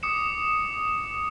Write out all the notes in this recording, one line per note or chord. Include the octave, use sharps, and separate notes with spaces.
D6 D#6 C#7 E7